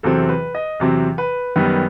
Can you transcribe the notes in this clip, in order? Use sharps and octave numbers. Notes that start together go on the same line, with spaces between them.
E2 C3 F#3 C4 A4
B4
D#5
E2 C3 F#3 C4
B4
F#2 D#3 G3 B3 B4